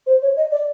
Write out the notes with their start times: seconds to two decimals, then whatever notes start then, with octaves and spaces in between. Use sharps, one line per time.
0.07 C5
0.22 C#5
0.37 D#5
0.51 D5